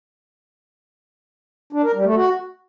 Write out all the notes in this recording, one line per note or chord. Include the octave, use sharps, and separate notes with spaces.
D4
A#4
G3
A3
F#4